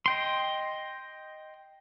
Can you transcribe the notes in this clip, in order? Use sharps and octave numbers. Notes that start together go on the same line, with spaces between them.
D#5 G5 C6